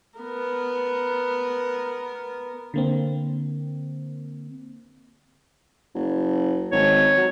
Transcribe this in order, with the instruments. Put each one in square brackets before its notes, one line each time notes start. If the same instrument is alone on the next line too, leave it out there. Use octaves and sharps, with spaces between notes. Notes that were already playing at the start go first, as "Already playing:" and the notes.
[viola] B3 A#4
[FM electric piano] D3 A#3 C4
[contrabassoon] F#1
[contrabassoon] G#1 [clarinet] C#5
[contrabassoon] F#3